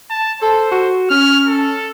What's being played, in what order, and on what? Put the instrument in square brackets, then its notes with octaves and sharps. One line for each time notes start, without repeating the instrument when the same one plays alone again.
[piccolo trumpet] A5
[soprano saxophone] A4 [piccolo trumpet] C5
[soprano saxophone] F#4
[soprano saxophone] C#4 [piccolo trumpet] F6
[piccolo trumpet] A4